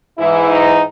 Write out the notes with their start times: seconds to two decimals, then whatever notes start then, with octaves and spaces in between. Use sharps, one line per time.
0.18 G#2 E3 E4
0.49 D#4